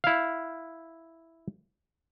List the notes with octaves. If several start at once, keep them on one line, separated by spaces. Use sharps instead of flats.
E4 F5